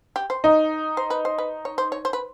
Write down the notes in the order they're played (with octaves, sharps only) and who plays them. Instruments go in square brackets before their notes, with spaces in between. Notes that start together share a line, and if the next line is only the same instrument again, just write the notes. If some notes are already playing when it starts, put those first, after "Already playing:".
[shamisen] G4
C5
[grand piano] D#4
[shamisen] C5
B4
C5
B4
C#5
C5
C#5
C5
B4